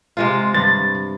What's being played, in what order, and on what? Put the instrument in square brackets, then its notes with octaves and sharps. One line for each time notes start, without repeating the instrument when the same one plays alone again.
[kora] C3 G#3 F4
[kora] G2 [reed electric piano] A6